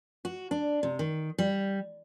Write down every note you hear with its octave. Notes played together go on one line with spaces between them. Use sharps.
F#4
D4
C3
D#3
G3